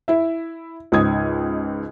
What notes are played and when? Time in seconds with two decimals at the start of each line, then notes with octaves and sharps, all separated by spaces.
0.08 E4 E5
0.92 C#2 G#2 D#6 G#6